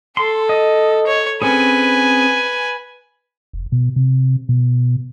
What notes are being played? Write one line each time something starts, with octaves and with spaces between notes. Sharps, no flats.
A4 C6
D#5
C#5
C4 C#4 G#4 B4 G#5
F1
B2
C3
B2